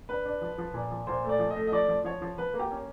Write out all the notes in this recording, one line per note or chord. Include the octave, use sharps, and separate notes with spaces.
D4 B4
D4
F3
F3
A#2
F3
A#2 C5
A3
D5
F3
D#5
A3
D#5
F3 D5
F3
F3 C#5
F3
F3 B4
A#3
G4
C#4